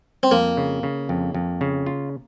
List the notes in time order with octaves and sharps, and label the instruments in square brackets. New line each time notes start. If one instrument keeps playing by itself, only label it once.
[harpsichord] C4
[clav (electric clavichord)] F2 [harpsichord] A#3
[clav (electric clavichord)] C#3
C#3
F2
F2
C#3
F4